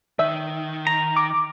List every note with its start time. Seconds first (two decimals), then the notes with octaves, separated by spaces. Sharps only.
0.19 D#3 E5
0.87 A#5
1.16 D6